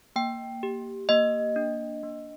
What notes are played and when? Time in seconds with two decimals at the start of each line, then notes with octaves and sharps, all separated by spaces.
0.16 A#3 G5
0.63 G4
1.09 A#3 D#5
1.56 D4
2.03 A#3